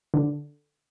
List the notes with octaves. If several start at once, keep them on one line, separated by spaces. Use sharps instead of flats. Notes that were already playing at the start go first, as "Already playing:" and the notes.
D3